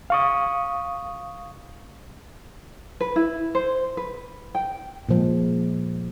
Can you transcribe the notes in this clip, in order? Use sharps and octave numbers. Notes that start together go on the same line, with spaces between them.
F5 C#6 D#6
B4
E4
C5
B4
G5
A#2 F3 G#3